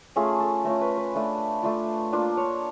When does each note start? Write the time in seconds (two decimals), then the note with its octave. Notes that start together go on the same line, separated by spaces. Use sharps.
0.16 A3 C#4 F4 G#4
0.40 A4
0.64 A3 C#4 F4 A#4
0.81 B4
0.97 B4
1.15 A3 D4 F4
1.63 A3 D4 F4
2.13 A#3 D4 F4
2.37 C#5